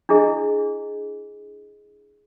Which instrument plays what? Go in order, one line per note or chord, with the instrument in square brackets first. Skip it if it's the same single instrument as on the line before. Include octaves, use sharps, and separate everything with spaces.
[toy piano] D4 E4 G#4 D#5